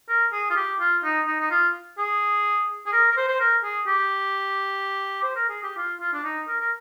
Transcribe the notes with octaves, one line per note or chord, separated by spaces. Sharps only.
A#4
G#4
F4
G4
F4
D#4
D#4
D#4
F4
G#4
G#4
A#4
A#4
C5
C5
A#4
G#4
G4
C5
A#4
G#4
G4
F4
F4
D4
D#4
A#4
A#4